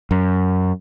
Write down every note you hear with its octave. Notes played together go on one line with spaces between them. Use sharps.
F#2